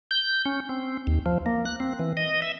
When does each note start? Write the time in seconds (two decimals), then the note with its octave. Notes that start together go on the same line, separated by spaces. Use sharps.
0.11 G6
0.45 C#4
0.69 C4
1.07 D#2
1.26 F3
1.46 A#3
1.65 F#6
1.80 C4
1.99 E3
2.17 D#5
2.42 E5